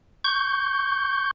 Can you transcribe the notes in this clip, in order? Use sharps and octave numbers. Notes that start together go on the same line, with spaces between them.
C#6 G6